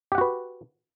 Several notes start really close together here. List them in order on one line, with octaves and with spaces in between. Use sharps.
G4 F#5 F#4 B4